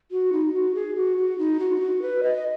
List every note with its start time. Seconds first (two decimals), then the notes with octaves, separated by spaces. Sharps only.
0.11 F#4
0.33 D#4
0.54 F#4
0.75 G#4
0.96 F#4
1.18 F#4
1.39 D#4
1.60 F#4
1.76 D#4
1.81 F#4
2.02 B4
2.23 D#5